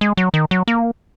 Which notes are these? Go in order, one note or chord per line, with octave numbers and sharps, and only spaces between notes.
G#3
F#3
D#3
F#3
A#3